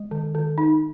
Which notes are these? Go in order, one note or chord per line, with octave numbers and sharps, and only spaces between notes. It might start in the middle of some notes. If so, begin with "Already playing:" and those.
Already playing: G#3
D#3
D#3
D#4